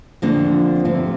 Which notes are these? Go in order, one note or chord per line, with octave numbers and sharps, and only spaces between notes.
F2 D3 F3 A#3 D4
F2 C3 F3 A3 C4